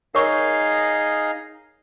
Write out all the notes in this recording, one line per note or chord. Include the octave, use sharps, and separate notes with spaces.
D#4 G#4 A#4 C#5 F5 C#6